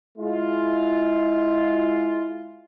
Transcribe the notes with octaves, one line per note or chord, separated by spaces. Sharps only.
G#3 E4 F4